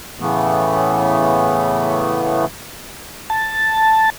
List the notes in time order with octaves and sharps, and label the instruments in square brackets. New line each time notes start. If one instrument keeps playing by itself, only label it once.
[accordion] A2 C#3 E3 A3 B3
[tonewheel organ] A5